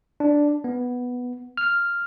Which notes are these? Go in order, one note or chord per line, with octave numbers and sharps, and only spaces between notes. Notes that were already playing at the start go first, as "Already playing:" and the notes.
D4
B3
F6